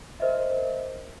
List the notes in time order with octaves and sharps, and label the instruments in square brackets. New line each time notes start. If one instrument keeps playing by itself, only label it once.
[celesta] A#4 C5 D#5 E5